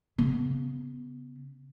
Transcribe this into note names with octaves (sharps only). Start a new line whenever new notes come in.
C#3 B3